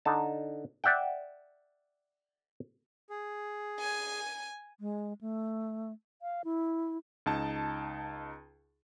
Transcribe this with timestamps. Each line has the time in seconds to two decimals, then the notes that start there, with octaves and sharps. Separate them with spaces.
0.05 D3 D#4 A5
0.84 D5 E5 F#5 G5
3.10 G#4
3.80 G#5 D#7
4.79 G#3
5.21 A3
6.22 F5
6.45 E4
7.26 C#2 D#4 A5